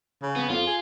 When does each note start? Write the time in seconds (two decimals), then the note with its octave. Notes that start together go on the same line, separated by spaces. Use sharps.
0.22 C#3
0.36 B3
0.50 F2 F4
0.66 G#4